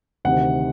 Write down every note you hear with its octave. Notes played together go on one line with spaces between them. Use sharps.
D2 C3 D#3 F#5